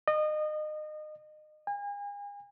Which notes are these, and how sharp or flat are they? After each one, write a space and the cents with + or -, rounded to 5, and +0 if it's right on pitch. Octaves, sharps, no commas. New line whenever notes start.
D#5 -30
G#5 -40